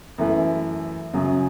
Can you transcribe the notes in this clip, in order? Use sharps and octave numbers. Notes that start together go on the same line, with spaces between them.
F#2 E3 A3 E4
F#2 C#3 F#3